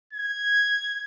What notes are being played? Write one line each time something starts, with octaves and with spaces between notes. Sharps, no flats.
G#6